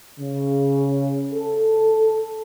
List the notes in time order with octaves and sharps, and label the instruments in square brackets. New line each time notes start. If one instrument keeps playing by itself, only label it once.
[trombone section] C#3
A4